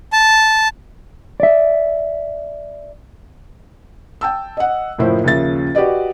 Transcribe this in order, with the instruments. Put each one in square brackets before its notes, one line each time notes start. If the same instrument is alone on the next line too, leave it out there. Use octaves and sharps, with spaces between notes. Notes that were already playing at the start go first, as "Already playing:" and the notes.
[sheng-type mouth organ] A5
[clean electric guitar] D5 E5
[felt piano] G5 A5 E6
D#5 F#5
F#1 A2 F3 E4 C5
D#2 C#3 F3 E5 A6
F#4 G4 B4 D5 D#5